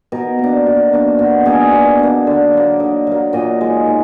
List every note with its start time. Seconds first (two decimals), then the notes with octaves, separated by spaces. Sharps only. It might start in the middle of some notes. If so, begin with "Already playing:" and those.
0.12 B2 A#4
0.39 A#3 D4
0.66 B2
0.93 A#3 D4
1.19 B2 F#4
1.46 A#3 D4 G#4
1.72 B2
1.99 A#3 D4
2.27 D3
2.53 F#3 A#3
2.80 D3 D#5
3.07 F#3 A#3 F5
3.33 A#2 D#5
3.61 G#3 D#4
3.86 A#2